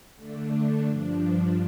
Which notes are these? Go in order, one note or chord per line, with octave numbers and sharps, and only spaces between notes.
D3 A3 D4
G2 F3 D4